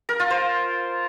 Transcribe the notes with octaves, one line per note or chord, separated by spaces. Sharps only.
A#4
F4
C5